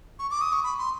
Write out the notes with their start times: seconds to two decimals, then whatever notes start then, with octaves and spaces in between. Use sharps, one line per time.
0.19 C#6
0.30 D6
0.41 D#6
0.52 C#6
0.64 B5
0.79 C6